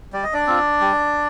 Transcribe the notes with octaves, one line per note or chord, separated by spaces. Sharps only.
G3 D5
D#5
D4 D5
C4 F4
G3